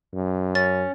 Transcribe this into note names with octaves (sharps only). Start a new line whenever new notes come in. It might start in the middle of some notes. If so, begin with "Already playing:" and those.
F#2
C#4 A6